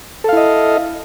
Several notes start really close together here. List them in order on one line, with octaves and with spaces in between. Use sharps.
A4 F5 E4 D#5